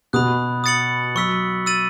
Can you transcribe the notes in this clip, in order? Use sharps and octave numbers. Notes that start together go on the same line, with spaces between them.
B2 B5 D#6 F#6
D#6 A6 C#7 F#7
F#3 C#6 E6 B6
E6 A6 D#7 F#7